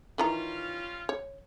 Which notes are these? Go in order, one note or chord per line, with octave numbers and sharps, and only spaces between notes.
D#3 E3 G3 C#4 F4 A#5
C#5